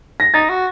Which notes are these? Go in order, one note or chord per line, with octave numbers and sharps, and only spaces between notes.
A#6
D#4 A6
F#4